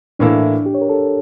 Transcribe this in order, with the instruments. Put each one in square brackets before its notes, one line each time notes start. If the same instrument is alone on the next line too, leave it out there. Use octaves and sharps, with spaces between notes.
[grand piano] A2 E3 A#3 E4 A4 [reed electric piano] D4
[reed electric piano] G4
C#5
A#4
A4